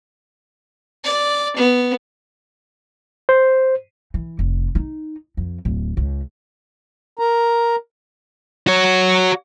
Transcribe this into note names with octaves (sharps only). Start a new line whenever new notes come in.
D5
B3
C5
E3
F1
D#4
F2
D1
C#2
A#4 A#5
F#4 C#5